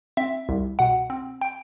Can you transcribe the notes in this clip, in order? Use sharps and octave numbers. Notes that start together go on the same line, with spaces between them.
C4 E5
C2
B2 F#5
C4
G5